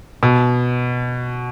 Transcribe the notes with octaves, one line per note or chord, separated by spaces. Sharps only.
B2